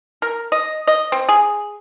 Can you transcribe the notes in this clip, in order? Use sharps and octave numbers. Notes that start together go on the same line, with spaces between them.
A#4
D#5
D#5
C4
G#4